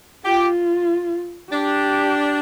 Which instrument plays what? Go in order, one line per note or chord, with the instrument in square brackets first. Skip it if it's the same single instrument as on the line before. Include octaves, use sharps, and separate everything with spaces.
[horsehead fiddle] F4 [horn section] G4
[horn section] D4 [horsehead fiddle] G4